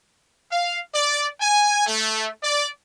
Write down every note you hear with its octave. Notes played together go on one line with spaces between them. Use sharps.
F5
D5
G#5
A3
D5